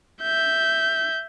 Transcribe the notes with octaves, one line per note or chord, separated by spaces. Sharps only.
E5 G6